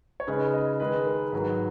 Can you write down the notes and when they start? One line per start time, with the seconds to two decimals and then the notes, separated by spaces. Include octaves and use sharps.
0.20 C#5
0.27 C#3 G#3 D#4 B4
0.54 D#5
0.80 D#3 G#3 D#4 B4
1.06 A#4
1.32 G#2 D#3 F#3 B4